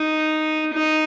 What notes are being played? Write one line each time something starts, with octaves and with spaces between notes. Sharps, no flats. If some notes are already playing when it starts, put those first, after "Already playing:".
Already playing: D#4
D#4